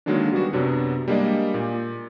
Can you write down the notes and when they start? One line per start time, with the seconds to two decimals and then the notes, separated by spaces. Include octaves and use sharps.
0.06 D3 D#3 F#3 G#3 A#3 D4
0.32 F#3 G3 B3 F#4
0.53 F#2 C3 F#3 B3 D4
1.08 G3 G#3 A#3 D4 D5 D#5
1.54 A#2